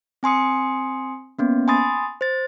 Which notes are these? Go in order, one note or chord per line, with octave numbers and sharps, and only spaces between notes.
C4 G#5 C6 D#6 C#7
A#3 B3 C#4
G#5 B5 C6 D#6 A6
C5 A6